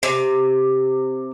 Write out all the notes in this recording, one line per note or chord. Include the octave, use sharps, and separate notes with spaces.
C3